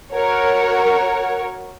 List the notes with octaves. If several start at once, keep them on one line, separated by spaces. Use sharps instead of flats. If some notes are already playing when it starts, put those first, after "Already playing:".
F#4 A#4 C#5